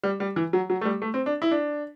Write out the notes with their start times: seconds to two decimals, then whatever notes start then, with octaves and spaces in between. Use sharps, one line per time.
0.03 G3
0.20 G3
0.36 E3
0.53 F#3
0.70 F#3
0.81 A3
0.85 G3
1.02 A3
1.14 C4
1.26 D4
1.42 E4
1.51 D4